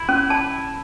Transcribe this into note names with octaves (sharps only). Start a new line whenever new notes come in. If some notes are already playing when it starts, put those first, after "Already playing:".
Already playing: E4
C#4
E4 A5